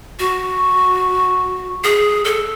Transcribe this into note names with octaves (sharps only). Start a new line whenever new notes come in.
F#4
G#4
A4